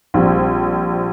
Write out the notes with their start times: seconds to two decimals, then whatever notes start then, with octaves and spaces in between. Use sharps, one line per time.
0.14 A#1 G3 C4